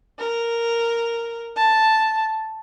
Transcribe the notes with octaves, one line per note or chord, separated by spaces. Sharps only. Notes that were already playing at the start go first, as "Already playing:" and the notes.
A#4
A5